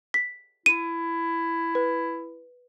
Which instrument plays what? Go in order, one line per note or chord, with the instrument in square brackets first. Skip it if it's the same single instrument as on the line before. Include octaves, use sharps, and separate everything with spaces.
[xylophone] B6
[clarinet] E4 [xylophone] D#7
[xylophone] B4